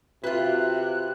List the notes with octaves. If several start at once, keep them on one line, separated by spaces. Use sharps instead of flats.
C3 F4 F#4 B4 E5 F#6